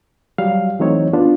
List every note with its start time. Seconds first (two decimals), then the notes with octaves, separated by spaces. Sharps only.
0.38 F#3 G3 F5
0.80 E3 F#3 A3 C4 D#4 C#5
1.13 B3 D4 F4